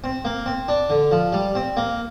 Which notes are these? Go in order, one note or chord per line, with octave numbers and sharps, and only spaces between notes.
C4
A#3
C4
D4
D3
F3
G3
C4
A#3